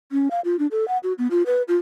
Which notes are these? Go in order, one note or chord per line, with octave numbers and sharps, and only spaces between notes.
C#4
F5
F4
D4
A4
F#5
F#4
B3
F4
B4
F4